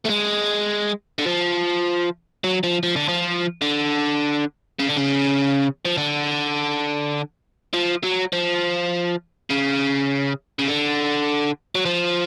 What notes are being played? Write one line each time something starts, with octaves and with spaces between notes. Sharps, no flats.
A3
G#3
D3
F3
F#3
F3
F3
D3
F3
D3
C#3
D3
C#3
F3
D3
F3
F#3
F3
C#3
C#3
D3
F#3
F3